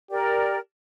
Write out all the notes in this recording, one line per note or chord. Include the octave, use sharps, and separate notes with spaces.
G4 A#4 D5